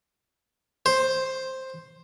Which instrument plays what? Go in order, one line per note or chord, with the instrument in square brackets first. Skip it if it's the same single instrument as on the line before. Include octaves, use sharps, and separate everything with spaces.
[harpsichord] C5